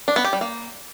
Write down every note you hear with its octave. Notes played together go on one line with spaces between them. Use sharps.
D4
B3
G4
G3
A#3